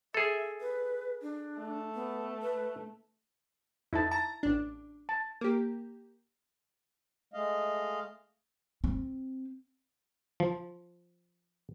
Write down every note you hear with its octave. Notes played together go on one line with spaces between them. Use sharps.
G#4 A4 E5
B4
D4
A3
B3
B4
F2 D#4 E4 A5
A5 A#5
A1 D4
A5
A#3 G4
G#3 A3 D#5 F5
C4
F3